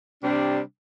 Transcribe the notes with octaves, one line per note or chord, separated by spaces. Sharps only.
C3 G3 D4